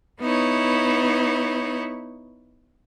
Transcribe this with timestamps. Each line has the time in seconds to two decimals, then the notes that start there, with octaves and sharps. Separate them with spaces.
0.21 B3 D#4 E4 C#5